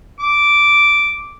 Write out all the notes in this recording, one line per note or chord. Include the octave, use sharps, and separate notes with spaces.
D6